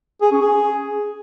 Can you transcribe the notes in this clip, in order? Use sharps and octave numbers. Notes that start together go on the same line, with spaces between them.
G#4
C#4
G#4